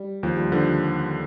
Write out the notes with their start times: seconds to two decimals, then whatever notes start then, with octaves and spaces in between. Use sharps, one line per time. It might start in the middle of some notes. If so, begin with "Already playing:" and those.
Already playing: G3
0.23 D#2 F3
0.37 G3
0.52 D3 F3